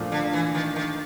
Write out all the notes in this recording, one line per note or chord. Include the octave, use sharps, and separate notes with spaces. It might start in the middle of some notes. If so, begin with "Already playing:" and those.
Already playing: A#2 F3 A3 D4 F4
D3
E3
D#3
D#3